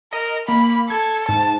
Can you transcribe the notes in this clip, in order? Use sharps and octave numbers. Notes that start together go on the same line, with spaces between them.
A#4 D#5
A#3 B5
A4 G#6
G#2 A5